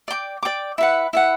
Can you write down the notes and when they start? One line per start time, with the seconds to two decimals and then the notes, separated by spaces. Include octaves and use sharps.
0.08 D5 G5 D6
0.43 D5 G5 D6
0.78 E4 B4 F#5
1.13 E4 B4 F#5